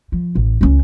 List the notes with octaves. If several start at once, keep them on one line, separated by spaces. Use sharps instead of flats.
F3
A1
C#2 C#4